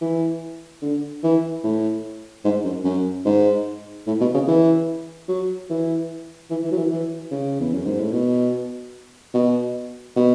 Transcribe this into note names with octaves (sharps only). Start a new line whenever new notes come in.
E3
D3
E3
A2
G#2
F#2
F#2
G#2
A2
B2
C#3
E3
F#3
E3
E3
E3
F#3
E3
E3
C#3
E2
F#2
G#2
A2
B2
B2
B2